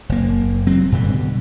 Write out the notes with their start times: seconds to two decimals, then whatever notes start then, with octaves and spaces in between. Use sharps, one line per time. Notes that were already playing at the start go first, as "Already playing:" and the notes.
0.09 F#1 A#3
0.67 F#3 C4
0.92 G2 B2 D3 G3